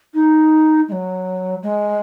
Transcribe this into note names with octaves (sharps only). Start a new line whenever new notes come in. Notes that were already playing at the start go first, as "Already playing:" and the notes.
D#4
G#3
F#3
G#3